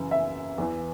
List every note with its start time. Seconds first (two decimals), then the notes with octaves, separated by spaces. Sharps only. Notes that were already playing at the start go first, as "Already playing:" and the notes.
Already playing: F#2 C#3 E3
0.11 E5
0.58 E2 E3